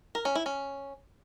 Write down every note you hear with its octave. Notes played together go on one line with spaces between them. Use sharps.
A#4
C#4
E4
C#4